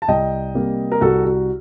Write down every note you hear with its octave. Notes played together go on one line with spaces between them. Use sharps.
A5
C2 D#5 G5
C3 G3 A#3
A#4
C2 F#4 A4
F#4